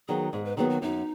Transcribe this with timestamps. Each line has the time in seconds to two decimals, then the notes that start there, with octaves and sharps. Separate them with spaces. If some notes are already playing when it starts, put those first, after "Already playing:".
0.08 D#3 F#3 B3 G#4
0.33 G#2 G#4
0.45 B4
0.57 D#3 F#3 B3 G#4
0.70 F#4
0.82 F#2 D#4